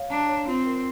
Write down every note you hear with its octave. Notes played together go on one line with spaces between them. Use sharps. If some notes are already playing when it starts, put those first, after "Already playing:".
Already playing: C#5 F5
D4 A#5
C#5
C4 F4
A#4